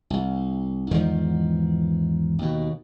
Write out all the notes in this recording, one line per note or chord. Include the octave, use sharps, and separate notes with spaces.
C2
E2 G#2 D#3 F3
D#2 B2